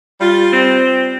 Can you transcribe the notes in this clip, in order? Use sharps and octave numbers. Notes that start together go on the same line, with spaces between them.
G3 F4
C4